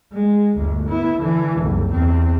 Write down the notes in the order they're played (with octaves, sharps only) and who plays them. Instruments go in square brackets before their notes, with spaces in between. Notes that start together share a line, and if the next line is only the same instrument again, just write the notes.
[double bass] G#3
G1 D2
B3 E4
D3 E3
F#1 C2
E2 C4